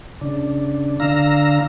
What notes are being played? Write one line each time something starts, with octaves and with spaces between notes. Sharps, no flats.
C#3 D4
D3 D4 F5 A#5 E6 A#6